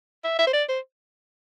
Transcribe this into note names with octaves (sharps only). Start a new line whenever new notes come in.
E5
E5
C5
D5
C5